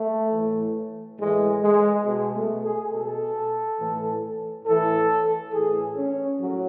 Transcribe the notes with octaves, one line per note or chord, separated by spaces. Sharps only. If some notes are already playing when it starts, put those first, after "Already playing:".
Already playing: A3
A2 E3
A2 E3 G#3
G#3
B2 G#3
A3
G#4
B2 A4
A2 E3
A2 E3 A4
A2 E3 G#4
C#4
A2 F#3